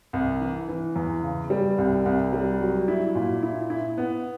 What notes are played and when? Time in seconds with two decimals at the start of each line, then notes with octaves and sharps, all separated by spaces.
0.13 C2
0.41 E3
0.68 E3
0.96 E2
1.23 C#3
1.50 G3
1.78 C2
2.06 C2
2.33 G3
2.60 F#3
2.88 E4
3.15 A#2
3.43 E4
3.70 E4
3.98 B3